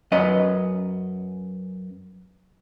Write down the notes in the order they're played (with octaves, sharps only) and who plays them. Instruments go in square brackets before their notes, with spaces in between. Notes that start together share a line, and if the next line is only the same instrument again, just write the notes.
[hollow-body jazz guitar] F#2 C#4 B4 D#5